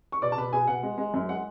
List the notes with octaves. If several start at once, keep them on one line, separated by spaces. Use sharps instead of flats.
C#6
B2 D5 D6
A5
B2 B4 B5
B2 G#4 G#5
B2 F#5
G#3
G#3
F#2
G#3 F#5